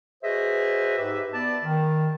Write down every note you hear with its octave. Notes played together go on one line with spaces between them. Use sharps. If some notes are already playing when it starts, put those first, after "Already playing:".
F#4 G#4 B4 C5 D#5 E5
G#2 G4 B4 E5
B3 D5 A5
D#3